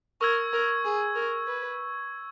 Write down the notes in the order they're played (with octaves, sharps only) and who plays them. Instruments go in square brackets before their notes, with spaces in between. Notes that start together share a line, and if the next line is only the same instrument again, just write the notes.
[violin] A#4 [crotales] C#6 E6 G#6
[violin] A#4
G#4
A#4
B4